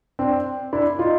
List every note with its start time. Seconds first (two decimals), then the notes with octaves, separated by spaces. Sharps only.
0.19 C4 D4
0.73 D4 E4
0.99 D#4 F4